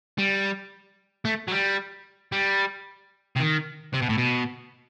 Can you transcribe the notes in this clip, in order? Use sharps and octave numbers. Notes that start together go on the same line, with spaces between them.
G3
A3
F#3
G3
G3
C3
D#3
C3
B2
A2
B2